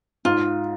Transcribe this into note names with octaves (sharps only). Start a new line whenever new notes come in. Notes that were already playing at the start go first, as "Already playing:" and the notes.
G#2 F4